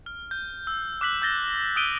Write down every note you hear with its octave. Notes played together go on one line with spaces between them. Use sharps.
F6
G6
E6
D6 F#6 B6 F#7
E6 G6 A6 A#6 G7
D#6 E6 F#6 D7 D#7 G7